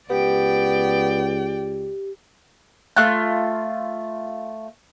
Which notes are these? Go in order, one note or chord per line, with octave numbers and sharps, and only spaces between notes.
C#2 B3 G4 D5 G5
A3 F4 F#6